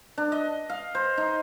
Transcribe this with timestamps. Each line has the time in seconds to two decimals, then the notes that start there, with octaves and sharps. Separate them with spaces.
0.18 D4
0.32 D#5
0.70 F5
0.95 C5
1.18 D#4